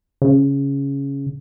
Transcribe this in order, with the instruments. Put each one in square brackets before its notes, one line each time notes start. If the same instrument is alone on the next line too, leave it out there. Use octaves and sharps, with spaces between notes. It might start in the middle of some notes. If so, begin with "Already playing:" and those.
[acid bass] C#3